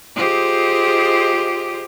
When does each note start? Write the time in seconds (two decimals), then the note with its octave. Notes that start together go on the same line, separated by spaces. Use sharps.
0.16 F4 G4 G#4 C5 D#5